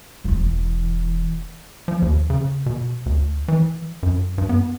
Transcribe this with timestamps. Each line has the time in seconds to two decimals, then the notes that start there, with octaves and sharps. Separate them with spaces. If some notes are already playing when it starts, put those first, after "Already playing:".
0.24 E1 E3
1.88 F3
2.02 D#2
2.30 C#3
2.66 B2
3.06 D2
3.48 E3
4.03 F#2
4.38 G2
4.49 B3